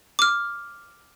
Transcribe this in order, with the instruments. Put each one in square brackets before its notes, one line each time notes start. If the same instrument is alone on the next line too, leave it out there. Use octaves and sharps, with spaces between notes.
[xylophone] D6 F6